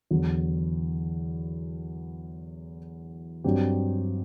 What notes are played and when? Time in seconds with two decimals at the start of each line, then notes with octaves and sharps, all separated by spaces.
0.11 E2 D3 F#3
3.44 G2 F#3 C4 G4